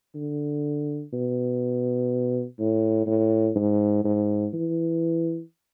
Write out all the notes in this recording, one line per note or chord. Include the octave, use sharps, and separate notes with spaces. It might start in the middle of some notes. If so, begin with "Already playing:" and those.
D3
B2
A2
A2
G#2
G#2
E3